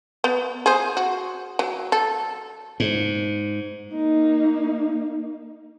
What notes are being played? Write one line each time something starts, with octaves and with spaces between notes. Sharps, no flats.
B3
G#4 C5
F#4
F#3
A4
G#2
A#3 D#4